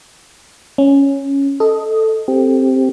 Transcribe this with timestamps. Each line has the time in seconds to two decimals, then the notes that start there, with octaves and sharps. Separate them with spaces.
0.78 C#4
1.60 A4 D#5
2.28 C4 G4